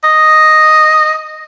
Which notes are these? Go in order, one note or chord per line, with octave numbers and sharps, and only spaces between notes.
D#5